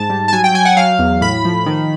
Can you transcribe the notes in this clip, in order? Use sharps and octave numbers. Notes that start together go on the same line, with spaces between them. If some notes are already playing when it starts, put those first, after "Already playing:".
Already playing: G#2 A5
G3
A5
F#3 G#5
G5
F#3 G#5
F#5
F#3 F5
E2
A2 B5
F3
D#3